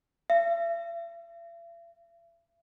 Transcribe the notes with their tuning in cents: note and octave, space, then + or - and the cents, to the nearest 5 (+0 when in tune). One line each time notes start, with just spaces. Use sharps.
E5 +45